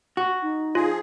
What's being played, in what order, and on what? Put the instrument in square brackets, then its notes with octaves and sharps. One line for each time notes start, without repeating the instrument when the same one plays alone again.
[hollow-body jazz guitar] F#4
[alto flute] D#4
[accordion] F3 G#4 [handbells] F4